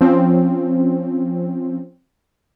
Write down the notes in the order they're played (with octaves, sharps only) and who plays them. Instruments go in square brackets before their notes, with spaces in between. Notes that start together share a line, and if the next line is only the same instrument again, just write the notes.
[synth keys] F3 C4 C#4